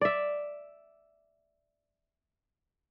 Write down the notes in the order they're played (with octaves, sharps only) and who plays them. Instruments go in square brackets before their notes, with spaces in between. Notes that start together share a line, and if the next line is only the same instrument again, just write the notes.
[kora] D5 E5